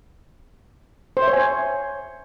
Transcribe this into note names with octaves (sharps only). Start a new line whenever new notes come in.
C5
E5
C#5
G#5